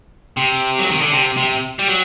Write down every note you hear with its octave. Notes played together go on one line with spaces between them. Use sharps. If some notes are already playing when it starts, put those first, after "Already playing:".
C3
F#3
D#3
D3
C3
C3
G3
F#3